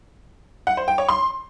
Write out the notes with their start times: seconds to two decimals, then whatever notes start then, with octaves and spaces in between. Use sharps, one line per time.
0.67 F#5
0.77 C5
0.88 G5
0.98 C#5
1.09 C6